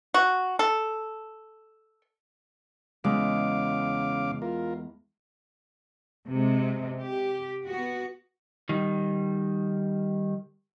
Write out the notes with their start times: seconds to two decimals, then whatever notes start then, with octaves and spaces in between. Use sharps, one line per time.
0.14 F#4
0.59 A4
3.04 E2 C#3 G#3 F5 D6
4.42 F4 A#4
6.29 C3 G#3
7.04 G4
7.66 B3 F#4
8.69 D#3 G3